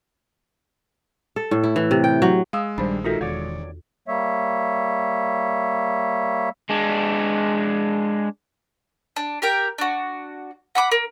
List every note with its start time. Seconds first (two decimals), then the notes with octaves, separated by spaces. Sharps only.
1.36 A4
1.51 A2
1.64 E4
1.76 E3
1.91 C3
2.04 G5
2.22 F#3
2.53 G#3 F5 D#6 E6
2.78 A#1 D#3 G3 D4 C5 B5
3.04 D#4 F4 F#4 A4 A#4 E5
3.21 E1 E2 D#3 C#5 D5
4.08 G3 A#3 C#5 E5
6.70 G#3 D4
9.16 D4
9.42 G4 A#4 G5
9.78 D4 F#4
10.75 F#5 B5 D6
10.92 A#4